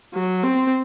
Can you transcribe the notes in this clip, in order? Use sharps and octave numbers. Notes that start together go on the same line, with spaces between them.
F#3
C4